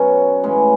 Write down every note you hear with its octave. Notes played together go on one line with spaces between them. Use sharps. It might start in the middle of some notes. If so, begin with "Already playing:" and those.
Already playing: B2 F#3 C#4
A2 E3 G#3 C#4